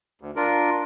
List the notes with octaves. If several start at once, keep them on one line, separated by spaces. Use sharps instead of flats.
D2
D4 F4 A#4